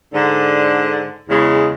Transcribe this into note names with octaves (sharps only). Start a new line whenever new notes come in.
G#2 D3
E2 C#3 G#3